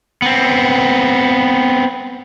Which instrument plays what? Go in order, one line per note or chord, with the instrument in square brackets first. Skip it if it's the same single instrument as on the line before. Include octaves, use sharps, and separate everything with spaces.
[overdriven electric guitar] B3 C4